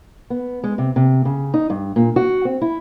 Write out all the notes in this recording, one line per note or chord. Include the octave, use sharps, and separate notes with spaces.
B3
G#3
C3
C3
C#3
D#4
G2
A#2
F#4
C4
E4